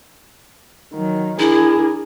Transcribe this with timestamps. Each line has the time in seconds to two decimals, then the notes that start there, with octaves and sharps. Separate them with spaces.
0.93 D#3 F#3
1.39 D4 E4 G#4 A#4